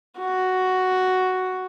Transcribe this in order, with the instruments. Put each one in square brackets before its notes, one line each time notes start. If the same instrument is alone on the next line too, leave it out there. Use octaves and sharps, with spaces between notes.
[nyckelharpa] F#4